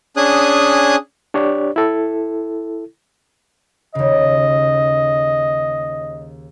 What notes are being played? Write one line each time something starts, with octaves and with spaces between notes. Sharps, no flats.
C#4 D4 G#4 G#5 D#6 F#6
D4 G4 C#5 D5
E4 A4
D#2 C#3 D#5